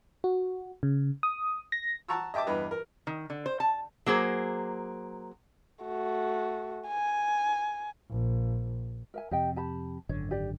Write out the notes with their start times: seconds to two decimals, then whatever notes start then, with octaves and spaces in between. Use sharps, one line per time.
0.24 F#4
0.83 C#3
1.23 D#6
1.72 A#6
2.08 F#5 A5 A#5 C#6 E6
2.34 D#5 E5 G5 A5 D6
2.47 E2 G2 B4 D#5
2.71 A#4
3.07 D#3
3.30 D3
3.46 C5
3.60 A5
4.06 F#3 A#3 G#4 C5
5.84 A3 F#4
6.88 G#5
8.10 A#1
9.14 A#4 E5 G#5
9.31 F2 C3 G4 D#5 G5
9.56 G4 A5 B5
10.09 G#1 F#2 D3 C#5
10.31 G4 D5